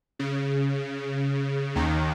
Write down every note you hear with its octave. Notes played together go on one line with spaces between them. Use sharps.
C#3
D#2 D#3